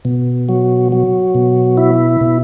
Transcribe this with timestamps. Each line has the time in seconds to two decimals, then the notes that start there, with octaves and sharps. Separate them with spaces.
0.05 B2
0.49 F#3
0.92 F#3
1.35 B2
1.77 E4
2.21 B2